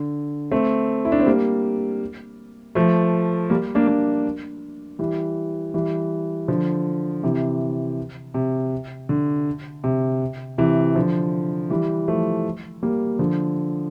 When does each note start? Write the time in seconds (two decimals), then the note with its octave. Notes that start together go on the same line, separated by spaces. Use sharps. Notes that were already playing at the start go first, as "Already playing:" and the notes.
Already playing: D3
0.51 A3 C4
1.05 E4
1.12 D4
1.20 C4
1.26 G3 A#3
2.75 F3 A3
3.50 G3 A#3
3.75 A#3 D4
3.87 A#3 D4
4.99 E3 G3
5.74 E3 G3
6.48 D3 F3
7.23 C3 E3
8.34 C3
9.09 D3
9.84 C3
10.58 C3 E3
10.96 D3 F3
11.70 E3 G3
12.08 F3 A3
12.83 G3 A#3
13.19 D3 F3